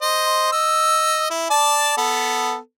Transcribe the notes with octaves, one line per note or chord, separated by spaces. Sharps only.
C5 D#5
D#5 E6
E4
D5 A5
B3 A4